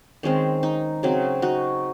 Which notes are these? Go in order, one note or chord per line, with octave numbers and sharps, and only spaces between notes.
D#3 G#3 C4 C#4
D#4
C#3 F#3 C4
D#4 F#4